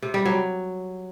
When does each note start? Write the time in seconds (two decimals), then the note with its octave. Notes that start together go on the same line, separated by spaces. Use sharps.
0.02 C3
0.14 G3
0.25 F#3